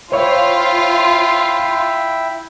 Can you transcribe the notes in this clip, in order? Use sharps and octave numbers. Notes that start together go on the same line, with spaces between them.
E4 F4 C5 C#5 E5 F5 G5